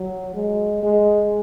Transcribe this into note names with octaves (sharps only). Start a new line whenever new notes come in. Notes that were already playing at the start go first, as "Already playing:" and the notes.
Already playing: F#3
G#3
G#3